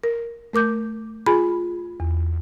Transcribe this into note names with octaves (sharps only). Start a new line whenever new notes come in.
A#4
A3 A#4 D6 G6
F4 G#4 G#5 B5
E2